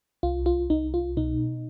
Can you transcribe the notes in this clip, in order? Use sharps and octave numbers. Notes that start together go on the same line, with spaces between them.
C2 F4
F4
C2 D#4
F4
B2 D#4